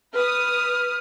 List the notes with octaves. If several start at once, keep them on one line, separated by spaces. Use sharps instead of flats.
B4 D#6 F6